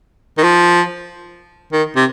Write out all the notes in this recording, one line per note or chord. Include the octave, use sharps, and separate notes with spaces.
D#3
F3
D#3
C3